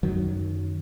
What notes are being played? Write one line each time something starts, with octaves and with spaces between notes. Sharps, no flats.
F#2 D#3 F#3